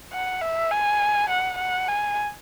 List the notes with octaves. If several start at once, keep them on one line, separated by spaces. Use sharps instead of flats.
F#5
E5
G#5
F#5
F#5
G#5